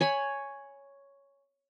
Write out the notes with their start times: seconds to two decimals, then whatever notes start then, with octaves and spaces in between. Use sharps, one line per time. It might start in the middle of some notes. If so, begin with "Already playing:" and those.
0.01 C#5 G#5 B5